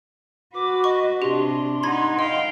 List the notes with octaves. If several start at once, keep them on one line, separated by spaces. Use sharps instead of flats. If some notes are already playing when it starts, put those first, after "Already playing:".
F#4 B4 D6
D#5 C#6
C3 D4 G4 C6
D#4 F#5 B5 G#6
D#5 F5 G5